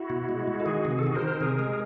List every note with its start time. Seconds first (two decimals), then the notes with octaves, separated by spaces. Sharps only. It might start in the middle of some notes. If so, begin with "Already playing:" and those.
Already playing: E4 F#4
0.10 B2
0.29 G#3
0.47 G#3
0.60 A4
0.66 D#3 F#4 G#4
0.85 C3
0.91 G#4
0.99 A4
1.03 D#3 F#4 G#4
1.15 A#4 C5
1.22 D#3
1.40 C3 G#4 A#4
1.59 G#3